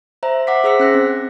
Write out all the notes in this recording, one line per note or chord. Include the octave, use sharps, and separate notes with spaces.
C5 E5 A#5
E5 F#5 D6 B6
G#4 C5 E6 B6 C#7
C#4 F#6 A#6
C4